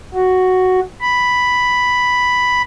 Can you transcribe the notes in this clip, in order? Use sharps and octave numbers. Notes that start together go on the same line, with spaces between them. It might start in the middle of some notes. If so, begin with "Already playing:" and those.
F#4
B5